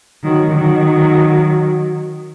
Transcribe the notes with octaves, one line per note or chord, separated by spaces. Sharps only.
D#3 F#3
D#3 F#3